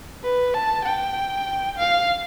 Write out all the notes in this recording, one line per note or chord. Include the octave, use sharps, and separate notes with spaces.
B4
A5
G5
F5